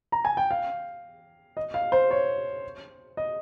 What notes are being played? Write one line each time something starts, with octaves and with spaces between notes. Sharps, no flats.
A#5
G#5
G5
F5
D#5
F5
C5
C#5
D#5